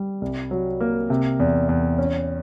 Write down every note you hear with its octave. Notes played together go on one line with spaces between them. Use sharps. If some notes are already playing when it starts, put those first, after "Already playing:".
Already playing: G3
C2
F#3
A#3
C3
E2
E2
C#4